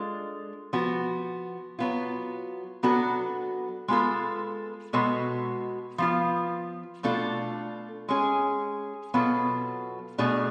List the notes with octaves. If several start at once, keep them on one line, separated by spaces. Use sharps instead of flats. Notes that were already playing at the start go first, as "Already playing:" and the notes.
Already playing: G#3 D4 F4 A4
F3 B3 F#4
F#3 B3 F4
F#3 B3 D4 F#4 A4
G#3 B3 F4 A4
B2 G#3 B3 F#4 A4
F3 B3 F4
B2 A3 D4 F4 A4
G#3 C#4 G#4
B2 F#3 B3 F4 A4
B2 A3 D4 G#4